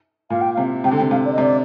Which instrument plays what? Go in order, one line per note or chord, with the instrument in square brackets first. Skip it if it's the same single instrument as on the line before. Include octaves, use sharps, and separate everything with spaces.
[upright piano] A#2 [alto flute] F5
[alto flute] G5
[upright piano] C3 [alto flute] F5
[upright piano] C3 [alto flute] G5
[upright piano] D3
[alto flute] G5
[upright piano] C3
[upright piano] C3 [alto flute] F5
[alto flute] D5
D#5
[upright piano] C3 [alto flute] D5